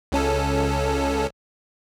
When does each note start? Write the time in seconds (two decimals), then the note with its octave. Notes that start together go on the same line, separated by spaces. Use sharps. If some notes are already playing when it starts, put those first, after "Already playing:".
0.12 C#2 C#4 A4